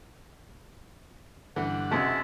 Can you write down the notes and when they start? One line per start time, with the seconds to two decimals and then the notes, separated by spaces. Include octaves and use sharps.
1.56 G2 D3 E3 F#5
1.91 B1 F#2 C3 G#3 E5 A5